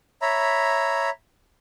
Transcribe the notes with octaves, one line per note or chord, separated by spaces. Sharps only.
C#5 E5 A#5 B5